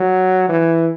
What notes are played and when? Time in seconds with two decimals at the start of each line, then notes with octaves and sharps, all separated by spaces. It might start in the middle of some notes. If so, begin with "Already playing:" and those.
Already playing: F#3
0.49 E3